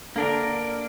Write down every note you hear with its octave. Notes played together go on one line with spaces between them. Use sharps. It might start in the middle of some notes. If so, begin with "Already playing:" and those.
D3 A#3 D4 A#4